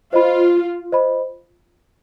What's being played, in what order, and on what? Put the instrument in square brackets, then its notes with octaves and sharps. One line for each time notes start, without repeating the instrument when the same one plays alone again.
[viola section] F4 [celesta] C5 D#5 B5
[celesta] C5 D#5 B5